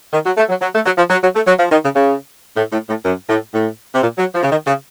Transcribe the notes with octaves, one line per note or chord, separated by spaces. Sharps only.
D#3
F#3
A3
F#3
F#3
A3
F#3
F3
F#3
F#3
A3
F#3
F3
D#3
C#3
C#3
A2
A2
A2
F#2
A2
A2
C3
A#2
F#3
F3
C#3
D#3
C#3